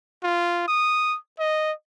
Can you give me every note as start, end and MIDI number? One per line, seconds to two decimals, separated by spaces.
0.23 0.65 65
0.68 1.17 87
1.39 1.72 75